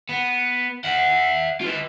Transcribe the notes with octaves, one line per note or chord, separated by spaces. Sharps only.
B3
E5 F#5
F4 B4